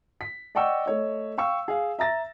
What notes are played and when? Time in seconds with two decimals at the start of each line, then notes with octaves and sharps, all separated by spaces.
0.21 B6
0.55 D5 D#5 F#5 G5 C#6 E6
0.86 A3 C#5 D#5
1.38 F5 G5 C#6 E6
1.68 G#4 F5
1.99 E5 A#5 A6 A#6